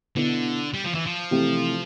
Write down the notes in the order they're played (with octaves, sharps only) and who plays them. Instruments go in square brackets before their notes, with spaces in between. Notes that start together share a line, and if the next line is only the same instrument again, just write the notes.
[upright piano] B2 B3 E4 [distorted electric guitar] D3
[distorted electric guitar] G3
F3
E3
F3
[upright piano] C3 E3 A3 C4 G4